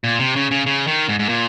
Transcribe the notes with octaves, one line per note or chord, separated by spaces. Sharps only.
A#2
C3
C#3
C#3
C#3
D#3
G#2
G#2
A#2